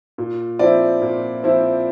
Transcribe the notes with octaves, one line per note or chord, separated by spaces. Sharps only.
A#2
F3 C4 E4 D5
A#2
F3 C4 E4